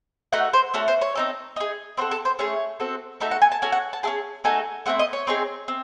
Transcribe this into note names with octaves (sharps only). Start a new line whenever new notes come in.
A3 D#4 F#4 F#5
C5
A3 C#4 F#4 A4
C5
C#5
C4 D#4 A4
D#4 G#4
C4 F#4 A4 C5
A4
C5
A3 C#4 G#4 C#5
C4 F#4 A4
A3 D#4 F#4 A4 E5
F#5
G#5
A5
C#4 F#4 A4 G#5
F#5
A5
C#4 E4 G#4 A5
A3 D#4 F#4 A4 G#5
A3 C4 E4 F#5
D#5
C#5
C4 D#4 G#4
C4